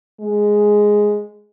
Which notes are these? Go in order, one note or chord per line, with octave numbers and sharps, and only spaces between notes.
G#3